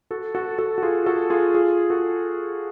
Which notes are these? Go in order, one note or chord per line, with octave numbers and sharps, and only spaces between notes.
F#4 A4
F#4 A4
F#4 A4
F#4
F4 G#4
F#4 A4
F4 G#4
F4 G#4
F#4 A4